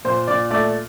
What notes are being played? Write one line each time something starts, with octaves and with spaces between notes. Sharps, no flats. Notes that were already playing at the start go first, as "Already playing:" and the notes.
A#2 C5
A#2 D5
A3 D5